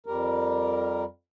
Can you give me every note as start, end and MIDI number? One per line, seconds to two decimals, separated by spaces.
0.06 1.04 41
0.06 1.04 55
0.06 1.04 70